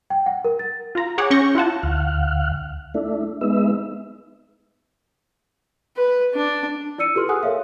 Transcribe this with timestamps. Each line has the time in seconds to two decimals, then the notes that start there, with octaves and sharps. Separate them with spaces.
0.10 G5
0.26 F#5
0.45 A#4
0.59 A6
0.95 F4 A#5
1.18 G#4 C#5 F#5 D6
1.31 C#4 C#6 G6 A#6
1.55 E4 F4 F#5 A5
1.83 D2 F5 F#5
2.94 A3 D4 E4
3.41 G#3 B3 D#4 E5
5.97 B4
6.34 D4
6.98 E4 D5 E6 C#7 D#7
7.15 F4 G4 A4 B4 C6 F6
7.28 G#4 A4 F#5 G#5 D#6 F#6
7.43 A4 A#4 C#5 E5 F5